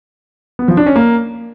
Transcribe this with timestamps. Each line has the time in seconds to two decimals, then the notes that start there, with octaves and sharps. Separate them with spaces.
0.59 B3
0.68 F3
0.77 D4
0.86 C#4
0.96 A#3